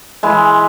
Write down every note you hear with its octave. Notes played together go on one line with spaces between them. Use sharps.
E3 G#3